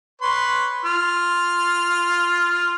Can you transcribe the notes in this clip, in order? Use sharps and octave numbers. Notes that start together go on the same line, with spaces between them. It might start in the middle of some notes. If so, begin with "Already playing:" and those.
B4 C#5 C6
F4 F6